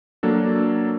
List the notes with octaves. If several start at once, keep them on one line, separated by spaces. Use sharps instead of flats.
F#3 A#3 D4 A4